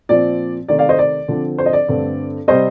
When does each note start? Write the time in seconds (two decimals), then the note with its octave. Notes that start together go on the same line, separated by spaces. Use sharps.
0.09 A#2 F3 C4 D5
0.68 C3 D#3 A3 D5
0.79 D5 F5
0.89 C5 D#5
0.99 D5
1.28 D3 F3 C4
1.58 C5
1.66 D#5
1.73 D5
1.88 G2 D3 A3 C4
2.48 C3 G3 C4 C5 D#5